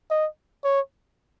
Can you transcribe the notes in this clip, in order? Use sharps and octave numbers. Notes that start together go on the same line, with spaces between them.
D#5
C#5